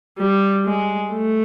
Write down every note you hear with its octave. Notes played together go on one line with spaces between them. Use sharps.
G3
G#3
A3